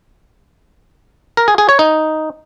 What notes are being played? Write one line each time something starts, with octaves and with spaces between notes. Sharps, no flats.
A#4
G#4
G#4
C#5
D#4